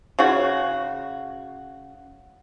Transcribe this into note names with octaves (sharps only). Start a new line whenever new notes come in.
C#3 F#4